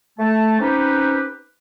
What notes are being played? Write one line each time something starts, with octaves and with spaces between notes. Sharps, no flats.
A3 A5
C4 C#4 D#4 G4 B4